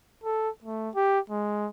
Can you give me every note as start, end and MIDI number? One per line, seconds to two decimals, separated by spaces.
0.24 0.49 69
0.64 0.90 57
0.95 1.20 67
1.30 1.68 56